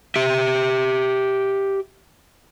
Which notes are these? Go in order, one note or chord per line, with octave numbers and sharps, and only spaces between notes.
G4 E5